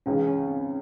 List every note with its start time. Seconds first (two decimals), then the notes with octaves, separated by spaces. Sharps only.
0.06 C#2 C#3 E3 C#4
0.27 C#4
0.47 C4